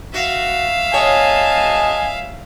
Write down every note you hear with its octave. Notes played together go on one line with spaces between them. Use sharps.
F#4 E5 F5
C#5 D#5 G#5 A5